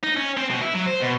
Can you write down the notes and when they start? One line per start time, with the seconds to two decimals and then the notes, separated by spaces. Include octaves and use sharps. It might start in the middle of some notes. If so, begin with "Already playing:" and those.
0.03 D#4
0.17 C#4
0.37 C4
0.50 B2
0.62 E4
0.75 F#3
0.88 C5
1.02 B2